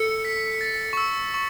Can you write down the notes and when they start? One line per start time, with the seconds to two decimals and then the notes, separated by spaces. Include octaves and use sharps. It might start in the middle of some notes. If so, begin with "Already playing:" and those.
Already playing: A4 C#7
0.25 B6
0.61 A6
0.93 C#6
0.97 E6
1.34 C#6